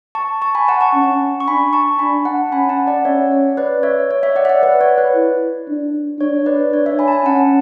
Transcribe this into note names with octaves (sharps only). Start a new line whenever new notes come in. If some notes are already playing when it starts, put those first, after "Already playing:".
A5 C#6
A5 C#6
G#5 B5
F#5 A5
A5 C#6
C#4
C#6
D4 G#5 B5
A5 C#6
D4 G#5 B5
F#5 A5
C#4 G#5 B5
F#5 A5
D5 F#5
C#4 C#5 E5
C#5
B4 D5
C#5 E5
C#5
C#5 E5
D5 F#5
E5
D5 F#5
B4 D5
C#5
B4
E4
D4
D4 C#5
B4 D5
D4 C#5
C#5 E5
G#5 B5
A5
G#5 B5
C#4 F#5 A5